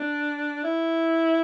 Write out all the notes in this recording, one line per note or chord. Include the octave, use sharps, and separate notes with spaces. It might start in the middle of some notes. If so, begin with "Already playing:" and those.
Already playing: D4
E4